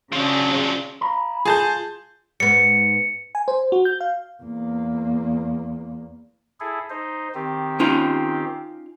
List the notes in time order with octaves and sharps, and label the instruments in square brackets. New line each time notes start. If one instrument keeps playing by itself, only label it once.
[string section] C#3 D4 [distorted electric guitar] F3 F#3
[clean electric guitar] F5 A#5 B5
[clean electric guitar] F4 [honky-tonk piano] G#4 A5 G6
[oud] G#2 B3 [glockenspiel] C#7
[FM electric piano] G#5
C5
F#4
G6
F5
[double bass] E2 A#3
[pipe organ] E4 G#4 A4
D#4 C5
D#3 C4 G4
[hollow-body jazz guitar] C#4 D#4 F4